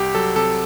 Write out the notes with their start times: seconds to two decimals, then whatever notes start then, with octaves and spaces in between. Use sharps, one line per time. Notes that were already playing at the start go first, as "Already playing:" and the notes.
Already playing: C2 G4
0.15 F#3 A4
0.35 C3 A4